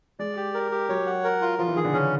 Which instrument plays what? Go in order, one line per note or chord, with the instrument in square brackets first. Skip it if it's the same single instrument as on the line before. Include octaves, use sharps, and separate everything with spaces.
[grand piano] G#3 [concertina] D5
[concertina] G4
A#4
G4
[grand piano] F#3 [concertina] C#5
[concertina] F#5
A#4
F4
[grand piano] F3 [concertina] F4
[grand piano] E3
[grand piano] D#3 [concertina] G#4
[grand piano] D3
[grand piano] C#3 [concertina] C#4